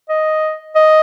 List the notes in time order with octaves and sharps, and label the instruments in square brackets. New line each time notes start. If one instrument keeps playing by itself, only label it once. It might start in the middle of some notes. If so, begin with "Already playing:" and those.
[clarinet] D#5
D#5